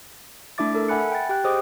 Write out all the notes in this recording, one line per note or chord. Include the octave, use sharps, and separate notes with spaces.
A3 D4 E4 E5 D6 A6
A4 A#4
E5 F#5 G#5 B5 F#6 C#7
G5 A6
G4 G5 F#6
G4 G#4 C5 D#5 D6 D#6